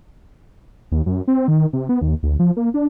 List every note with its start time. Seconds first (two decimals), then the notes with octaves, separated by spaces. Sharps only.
0.92 D#2
1.06 F#2
1.28 C4
1.48 D#3
1.73 C3
1.89 B3
2.02 D#2
2.23 D2
2.39 F3
2.57 A#3
2.74 D4